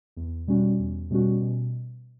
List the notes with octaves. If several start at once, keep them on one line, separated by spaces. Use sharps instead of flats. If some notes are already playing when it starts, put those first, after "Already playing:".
E2
B2 G3 C#4 F#4
E2
B2 G3 C#4 F#4
B2